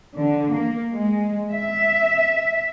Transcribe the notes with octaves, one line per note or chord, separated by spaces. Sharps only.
D3
A#3
G#3
E5